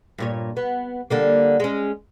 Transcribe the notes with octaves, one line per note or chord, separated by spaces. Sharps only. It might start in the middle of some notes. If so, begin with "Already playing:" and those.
G2 A#2 C#5
B3
D3 G3 A#3
G#3 C#4